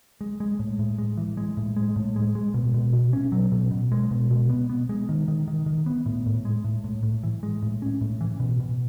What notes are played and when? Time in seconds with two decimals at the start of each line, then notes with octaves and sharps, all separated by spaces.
0.21 G#3
0.40 G#3
0.59 A2
0.79 A2
0.98 G#3
1.17 E3
1.37 G#3
1.57 A2
1.77 G#3
1.96 A2
2.16 G#3
2.35 G#3
2.54 B2
2.74 B2
2.93 B2
3.13 C#4
3.32 F#3
3.52 B2
3.71 B2
3.92 G#3
4.11 B2
4.31 B2
4.49 B3
4.70 B3
4.89 G#3
5.09 D#3
5.28 D#3
5.48 D#3
5.66 D#3
5.86 B3
6.06 A2
6.26 A2
6.45 G#3
6.64 A2
6.84 A2
7.03 A2
7.23 E3
7.43 G#3
7.62 A2
7.82 C#4
8.01 A2
8.21 E3
8.40 B2
8.60 B2